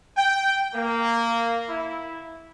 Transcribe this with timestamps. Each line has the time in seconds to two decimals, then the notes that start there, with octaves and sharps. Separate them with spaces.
0.17 G5
0.75 A#3
1.69 E4